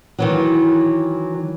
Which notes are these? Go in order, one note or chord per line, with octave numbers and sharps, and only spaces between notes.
D#3 E3 F#3